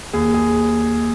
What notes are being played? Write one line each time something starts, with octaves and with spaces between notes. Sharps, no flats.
D#2 G#4
G#4